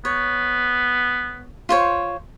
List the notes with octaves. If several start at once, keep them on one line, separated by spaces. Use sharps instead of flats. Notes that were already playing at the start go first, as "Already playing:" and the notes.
B3 C#5
F4 C5 C#5